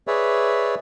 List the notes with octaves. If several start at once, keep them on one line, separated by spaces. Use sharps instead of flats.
G#4 B4 C#5 D5 E5